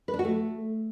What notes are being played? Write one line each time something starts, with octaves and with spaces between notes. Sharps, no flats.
B4
D4
F#4
A3